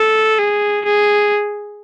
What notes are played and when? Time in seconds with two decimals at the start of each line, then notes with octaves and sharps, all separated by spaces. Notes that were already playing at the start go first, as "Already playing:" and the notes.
Already playing: A4
0.39 G#4
0.85 G#4